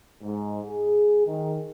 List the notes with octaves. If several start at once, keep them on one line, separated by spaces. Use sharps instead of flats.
G#2
G#4
D#3